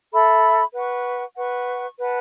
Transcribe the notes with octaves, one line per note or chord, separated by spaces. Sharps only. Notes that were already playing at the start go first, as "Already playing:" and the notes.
A4 E5 B5
B4 F#5 C#6
B4 F#5 C#6
B4 F#5 A5